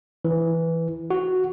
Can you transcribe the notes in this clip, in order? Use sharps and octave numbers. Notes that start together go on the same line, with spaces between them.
E3
F#4